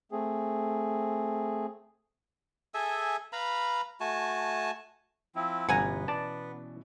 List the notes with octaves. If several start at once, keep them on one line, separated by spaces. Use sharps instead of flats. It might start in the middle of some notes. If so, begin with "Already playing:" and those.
A3 C4 G#4
G#4 A4 E5 G#5
B4 F5 A#5 B5
A3 F#4 G#5 A5
F3 C4 E4
G1 B2 E3 B3 C#4 F#5 G#5 A#5
D5 A5